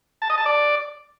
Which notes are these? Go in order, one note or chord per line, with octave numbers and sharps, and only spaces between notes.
A5
D#5
A5
D5